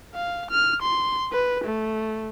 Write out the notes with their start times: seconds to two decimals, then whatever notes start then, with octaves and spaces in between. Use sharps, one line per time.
0.14 F5
0.51 F6
0.82 C6
1.33 B4
1.64 A3